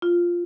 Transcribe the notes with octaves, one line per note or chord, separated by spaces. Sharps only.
F4